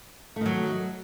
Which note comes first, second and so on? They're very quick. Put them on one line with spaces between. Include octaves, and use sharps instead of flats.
A3 D#3 F#3